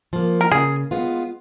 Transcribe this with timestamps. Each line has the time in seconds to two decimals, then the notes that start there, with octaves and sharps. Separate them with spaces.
0.13 F3 A#3
0.41 A#4
0.51 C#3 G#4
0.91 G#3 B3 F4